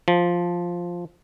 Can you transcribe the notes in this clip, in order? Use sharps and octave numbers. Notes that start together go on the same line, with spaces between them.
F3